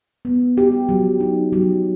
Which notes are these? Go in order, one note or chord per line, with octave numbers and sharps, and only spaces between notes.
B3
G4
F#3
D#4
F#3